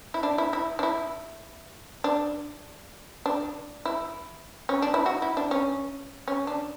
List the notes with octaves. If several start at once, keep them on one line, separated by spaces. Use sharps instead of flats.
E4
D4
E4
E4
D4
E4
D4
D4
E4
C#4
D4
E4
F#4
E4
D4
C#4
C#4
D4